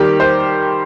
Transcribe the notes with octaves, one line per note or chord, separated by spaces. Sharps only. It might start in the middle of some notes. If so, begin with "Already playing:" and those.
Already playing: D#3 G3 A#3 G4
C5